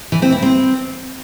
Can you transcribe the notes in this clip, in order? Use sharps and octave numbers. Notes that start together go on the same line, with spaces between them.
E3
C4
E4
C4